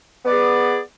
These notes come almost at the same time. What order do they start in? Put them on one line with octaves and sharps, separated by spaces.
B3 D5 G#4